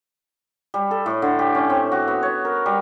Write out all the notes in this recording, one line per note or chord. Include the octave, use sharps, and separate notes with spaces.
G3
A4
A2
D3
G4
C#4
C4
F#4
B3
C#5
A#4
G3